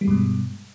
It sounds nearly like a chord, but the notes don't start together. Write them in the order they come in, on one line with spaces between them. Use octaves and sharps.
G3 G#3 G2 B2